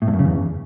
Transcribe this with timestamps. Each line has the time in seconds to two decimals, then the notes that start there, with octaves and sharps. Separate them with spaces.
0.02 A2
0.08 G2
0.13 F#2
0.19 C#3
0.25 E2